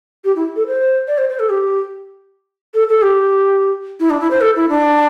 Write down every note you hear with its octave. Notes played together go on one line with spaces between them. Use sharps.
G4
E4
A4
C5
D5
C5
C5
A4
G4
A4
A4
G4
E4
D4
E4
C5
A4
E4
D4